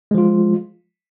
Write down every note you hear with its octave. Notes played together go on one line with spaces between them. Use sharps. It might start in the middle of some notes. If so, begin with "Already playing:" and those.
F3 G#3 F4